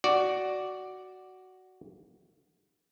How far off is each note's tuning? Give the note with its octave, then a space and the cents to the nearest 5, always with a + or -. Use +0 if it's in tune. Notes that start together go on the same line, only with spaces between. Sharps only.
F#4 +10 D5 +0